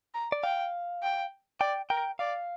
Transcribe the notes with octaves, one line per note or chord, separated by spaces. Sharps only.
A#5
D5
F5 G5
G5
D5 G5
A#4 G5
D5 F5